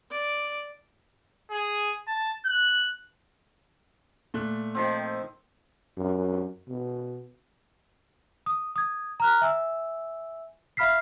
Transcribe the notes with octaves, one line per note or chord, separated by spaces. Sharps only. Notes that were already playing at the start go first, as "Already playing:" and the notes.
D5
G#4
A5
F#6
A#2 A3 F#6
D#3 F3 C4
F#2
B2
D#6
D#6 G#6
A#5 F6 F#6
E5 G#5 E6
E5 F5 B5 F6 B6 C7